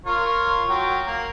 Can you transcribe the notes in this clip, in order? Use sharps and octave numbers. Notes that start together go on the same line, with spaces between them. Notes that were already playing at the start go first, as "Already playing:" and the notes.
F4 A#4 C#5
F#3 G5
A#3